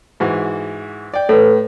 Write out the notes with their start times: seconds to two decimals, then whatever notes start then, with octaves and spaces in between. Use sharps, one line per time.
0.20 G#2 E3 F#4
1.14 D5 G5
1.29 A2 A4 B4